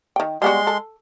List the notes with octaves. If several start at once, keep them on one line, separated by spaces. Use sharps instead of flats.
D#3 G5
G3 G#3 B3 F#4 C6
A4